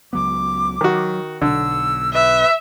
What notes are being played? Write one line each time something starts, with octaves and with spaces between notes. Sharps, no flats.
C#2 F#3 B3 D6
D#3 F#3 F#4
B1 D3 E6
B4 E5